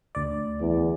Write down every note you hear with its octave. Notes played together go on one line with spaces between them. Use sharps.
D2 D5
E2